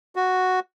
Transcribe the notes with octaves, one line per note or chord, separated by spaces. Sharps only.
F#4